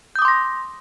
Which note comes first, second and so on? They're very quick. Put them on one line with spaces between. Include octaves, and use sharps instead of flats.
G6 D#6 D6 C6 A#6